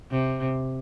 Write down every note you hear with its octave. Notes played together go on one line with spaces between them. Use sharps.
C3